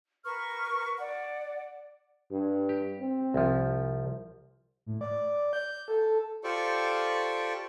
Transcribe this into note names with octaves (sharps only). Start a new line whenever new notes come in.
A#4 B4 C#6 F6
D5 F#5
G2
G4
C4
C2 F3
A2
D5
G6
A4
F4 G4 A4 C5 D5 C#6